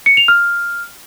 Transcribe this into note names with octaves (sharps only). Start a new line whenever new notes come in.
C#7
F7
F6